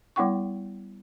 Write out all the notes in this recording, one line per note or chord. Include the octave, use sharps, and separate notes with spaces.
G3 B3 E4 F#5 G5 C#6